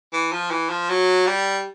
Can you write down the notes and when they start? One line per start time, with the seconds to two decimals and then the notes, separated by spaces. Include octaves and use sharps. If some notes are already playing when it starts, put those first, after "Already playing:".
0.13 E3
0.33 F3
0.51 E3
0.70 F3
0.90 F#3
1.27 G3